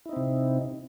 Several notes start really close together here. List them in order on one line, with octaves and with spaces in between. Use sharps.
E4 D#4 C4 C3